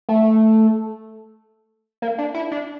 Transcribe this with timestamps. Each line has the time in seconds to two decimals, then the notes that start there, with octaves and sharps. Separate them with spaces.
0.09 A3
2.02 A#3
2.18 D4
2.34 E4
2.51 D4